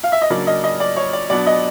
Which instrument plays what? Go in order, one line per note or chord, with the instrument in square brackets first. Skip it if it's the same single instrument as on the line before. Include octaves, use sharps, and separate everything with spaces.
[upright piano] F5
E5
D#5
C#3 F#3 A#3 D4 D5
D#5
D#5
D5
C#5
D5
B2 F#3 B3 D4 D5
D#5